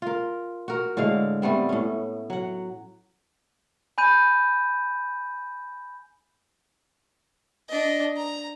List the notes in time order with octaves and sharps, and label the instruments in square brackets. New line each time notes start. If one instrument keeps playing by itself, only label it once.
[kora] F4 A#4
F#4 A#4
A2 D3 G#3 F5
G3 A3 B3 C4
A2 C#4
F#3 F#5
[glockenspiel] G#5 B5 G6 D#7
[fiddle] D4 D#5
A#5